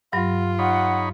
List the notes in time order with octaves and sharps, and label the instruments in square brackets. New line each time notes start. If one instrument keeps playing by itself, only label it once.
[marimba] G2 F#3 [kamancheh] F4
[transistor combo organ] D#4 C#5 B5 [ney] F#5